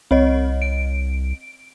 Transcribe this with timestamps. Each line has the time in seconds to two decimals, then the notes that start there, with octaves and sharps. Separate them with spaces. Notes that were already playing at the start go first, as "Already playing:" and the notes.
0.11 C2 C4 C#5 D#5
0.62 D7